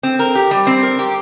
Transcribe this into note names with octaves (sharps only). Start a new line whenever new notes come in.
C4
A#4
G4
G3
C4
A#4
G4